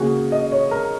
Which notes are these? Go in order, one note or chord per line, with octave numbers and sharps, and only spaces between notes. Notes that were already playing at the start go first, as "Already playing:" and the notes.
Already playing: C#3 A#3 F#4 G#4
D#5
C#5
A#4